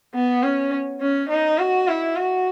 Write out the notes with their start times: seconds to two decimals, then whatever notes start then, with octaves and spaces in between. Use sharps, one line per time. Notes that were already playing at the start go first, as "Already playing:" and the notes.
0.14 B3
0.43 C#4
1.01 C#4
1.29 D#4
1.58 F#4
1.87 E4
2.16 F#4